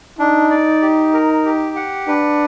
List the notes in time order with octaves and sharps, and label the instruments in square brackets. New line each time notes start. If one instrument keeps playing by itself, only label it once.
[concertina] D4 [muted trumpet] D#4
[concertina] D5
G4
A#4
G4
F#5
[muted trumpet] D4 [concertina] B4